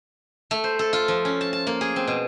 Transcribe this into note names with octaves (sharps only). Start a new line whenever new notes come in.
A3
C5
A4
F4
F3
C#4
A5
A5
A#3
G#4
C4
B2